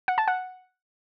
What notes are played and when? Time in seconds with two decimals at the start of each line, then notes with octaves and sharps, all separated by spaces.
0.08 F#5
0.18 A5
0.28 F#5